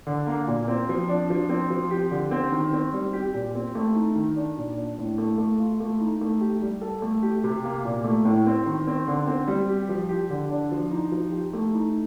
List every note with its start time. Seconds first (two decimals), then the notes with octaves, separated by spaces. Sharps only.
0.07 D3
0.27 A#3
0.48 A#2
0.68 C4
0.89 F3
1.09 D4
1.30 F3
1.49 C4
1.70 F3
1.91 G4
2.11 D3
2.31 C4
2.52 D#3
2.73 C4
2.93 G3
3.13 G4
3.34 A#2
3.55 C4
3.75 A3
3.95 D#4
4.15 D#3
4.36 D4
4.58 A#2
4.78 D4
4.98 A2
5.18 A3
5.38 A3
5.60 F4
5.80 A3
6.00 D#4
6.21 A3
6.41 G4
6.62 G3
6.81 A4
7.02 A3
7.23 G4
7.44 C3
7.64 A#3
7.85 A#2
8.04 A3
8.25 A2
8.46 C4
8.66 D#3
8.87 C4
9.08 D3
9.27 C4
9.48 G3
9.69 G4
9.89 F3
10.09 G4
10.30 D3
10.50 D4
10.72 F3
10.91 D#4
11.12 F3
11.32 G4
11.53 A3
11.74 D#4